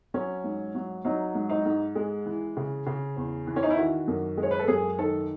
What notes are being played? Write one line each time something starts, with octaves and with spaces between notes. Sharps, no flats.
F#3 C#4
G#2
F#3
F#3 D#4
G#2
D#4
G#2
G#3
E3
C#3
C#3
E2
E3
C#4
D#4
E4
D#3 F#4
F#2
G#3
C#5
B4
A4
F#2 G#4
D#3 A4